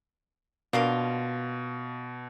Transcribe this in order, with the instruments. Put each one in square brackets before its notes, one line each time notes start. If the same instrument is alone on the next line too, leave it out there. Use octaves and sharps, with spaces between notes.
[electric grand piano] B2 [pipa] A#3 D4 F4